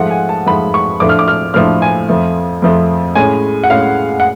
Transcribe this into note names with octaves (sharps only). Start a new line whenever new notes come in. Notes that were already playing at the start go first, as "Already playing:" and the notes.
Already playing: G#2 F3 A3 F#5
G#5
A5
G#2 F3 A3 B5
C#6
A2 F3 A3 D4 D6
F6
D6
F6
A2 F3 A3 D4 F6
G#5
F2 F3 A3
F2 F3 A3
A2 G#3 C#4 G#5
F#5
A2 G#3 C#4 F5
F#5